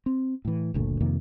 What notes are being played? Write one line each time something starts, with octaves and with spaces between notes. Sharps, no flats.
C4
A2 E3
F#1 D2 A#2 A3
F2 C3 D#3 A#3